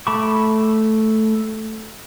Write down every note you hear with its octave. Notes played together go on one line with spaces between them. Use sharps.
A3 A5 B5 C#6 D6